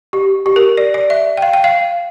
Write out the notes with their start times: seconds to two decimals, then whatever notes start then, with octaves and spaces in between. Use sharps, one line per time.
0.13 G4
0.46 G4
0.56 A#4
0.77 D5
0.94 D5
1.10 E5
1.37 G5
1.42 F5
1.53 G5
1.64 F5